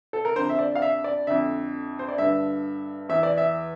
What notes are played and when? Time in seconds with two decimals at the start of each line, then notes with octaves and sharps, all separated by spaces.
0.13 A4
0.25 A#4
0.36 F2 D3 C5
0.49 E5
0.59 D5
0.75 F5
0.82 E5
1.04 D5
1.27 F2 D3 E5
1.99 C5
2.09 D5
2.18 G2 D3 E5
3.09 E2 E3 E5
3.23 D5
3.37 E5